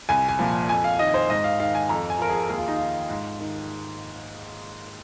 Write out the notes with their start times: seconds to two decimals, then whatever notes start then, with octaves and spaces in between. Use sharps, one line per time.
0.09 C2 G#5
0.29 G#5
0.39 A#2 F3
0.69 F2 G#5
0.84 F5
0.99 D#3 D#5
1.14 C5
1.29 G#2 D#5
1.44 F5
1.59 D#3 F5
1.75 G#5
1.89 F2 A#5
2.10 G#5
2.19 F3 A#4
2.29 G#4
2.49 D#2 G#4
2.58 F4
2.68 D#4
2.76 D#3 F4
3.09 G#2
3.40 D#3